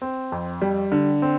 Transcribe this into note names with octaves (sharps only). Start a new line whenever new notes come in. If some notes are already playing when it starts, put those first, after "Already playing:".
C4
F2
G3
D3
C4